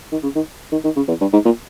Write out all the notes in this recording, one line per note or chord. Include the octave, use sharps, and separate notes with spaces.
D#3
C#3
D#3
D#3
D#3
C#3
E2
G2
G#2
A#2